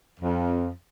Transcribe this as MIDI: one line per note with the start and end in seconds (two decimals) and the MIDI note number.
0.20 0.70 41